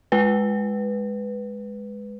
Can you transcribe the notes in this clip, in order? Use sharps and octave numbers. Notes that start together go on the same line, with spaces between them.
G#3 B4